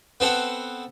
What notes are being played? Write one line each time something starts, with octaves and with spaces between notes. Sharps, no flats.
B3 C4 A4 F#5